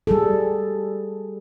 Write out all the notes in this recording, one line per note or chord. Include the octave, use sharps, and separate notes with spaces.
G3 G#4 A4